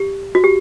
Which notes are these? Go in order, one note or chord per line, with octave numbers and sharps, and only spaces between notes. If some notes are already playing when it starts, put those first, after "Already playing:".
Already playing: G4
F#4
G4